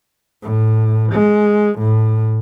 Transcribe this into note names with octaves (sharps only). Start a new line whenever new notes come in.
A2
G#3
A2